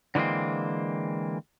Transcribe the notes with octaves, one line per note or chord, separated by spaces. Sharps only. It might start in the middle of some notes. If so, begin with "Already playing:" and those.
D3 E3 G#3 A#3 C4